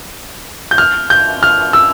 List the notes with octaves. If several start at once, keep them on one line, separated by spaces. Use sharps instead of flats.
G6
F6
G6
F6
E6